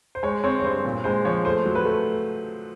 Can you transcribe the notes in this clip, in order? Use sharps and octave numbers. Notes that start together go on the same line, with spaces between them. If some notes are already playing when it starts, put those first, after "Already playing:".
C5
G#3 C#5
C4 C#5
C#5
G2 C5
A#2
G#3 C5
F3 C#5
A3 C5
F#3
B4
A3